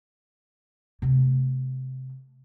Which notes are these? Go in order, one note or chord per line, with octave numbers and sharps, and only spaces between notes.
C3 A3